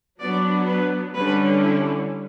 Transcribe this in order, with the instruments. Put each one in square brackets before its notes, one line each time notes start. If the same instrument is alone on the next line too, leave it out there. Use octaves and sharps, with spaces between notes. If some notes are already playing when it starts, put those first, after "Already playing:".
[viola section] F#3 B3 D4 D5
B4
D3 G3 C#4 B4
E4